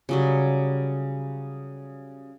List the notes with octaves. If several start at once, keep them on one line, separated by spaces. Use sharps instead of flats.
C#3 F#3 G3